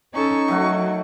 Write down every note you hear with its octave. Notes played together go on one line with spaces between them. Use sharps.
C#4 D#4 A4 C#6
D#3 F#3 A3 F#4